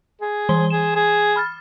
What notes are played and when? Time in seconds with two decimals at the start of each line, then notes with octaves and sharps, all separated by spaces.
0.21 G#4
0.49 E3 C6 G7
0.70 G#4 E7
0.96 G#4
1.36 B5 F6 A6